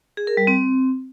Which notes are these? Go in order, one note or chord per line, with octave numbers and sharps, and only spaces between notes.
G#4
A#4
G3
C4